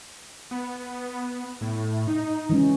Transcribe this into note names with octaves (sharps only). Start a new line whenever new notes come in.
B3
A2
D#4
E3 G#3 C#4